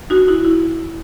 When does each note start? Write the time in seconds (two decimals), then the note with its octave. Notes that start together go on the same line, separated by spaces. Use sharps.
0.10 D#4 F#4
0.28 E4
0.45 E4